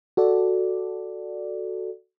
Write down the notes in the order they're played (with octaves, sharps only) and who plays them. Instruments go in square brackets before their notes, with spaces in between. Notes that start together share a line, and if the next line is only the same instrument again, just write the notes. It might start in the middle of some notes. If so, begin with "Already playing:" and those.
[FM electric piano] F#4 A4 D5